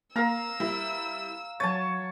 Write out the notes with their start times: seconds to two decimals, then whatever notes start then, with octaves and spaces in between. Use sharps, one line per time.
0.16 A#3 A#4 F5 A#5 E6
0.60 G3 E4 A#4
1.60 F#3 C#5 A5 A6 D#7